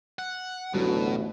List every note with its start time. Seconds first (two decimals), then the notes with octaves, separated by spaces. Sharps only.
0.19 F#5
0.74 A1 D2 B2 F#3